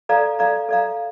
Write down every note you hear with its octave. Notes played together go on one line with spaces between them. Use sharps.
A4 D5 F5 A#5
A4 D5 F5 A#5
A4 D5 F5 A#5